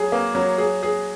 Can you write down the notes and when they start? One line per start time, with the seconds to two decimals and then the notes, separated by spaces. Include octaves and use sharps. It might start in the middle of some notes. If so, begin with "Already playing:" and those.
Already playing: F#3 G#4
0.12 A#3
0.35 F#3
0.58 G#4
0.83 G#4